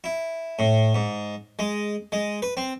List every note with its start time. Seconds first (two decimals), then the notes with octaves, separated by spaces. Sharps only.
0.04 E4
0.59 A2
0.94 G#2
1.59 G#3
2.12 G#3
2.42 B4
2.57 C4